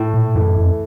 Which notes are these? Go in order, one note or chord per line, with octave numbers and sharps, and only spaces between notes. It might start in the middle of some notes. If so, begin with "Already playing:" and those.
Already playing: A2
A#2
F#2 E3 A3
F2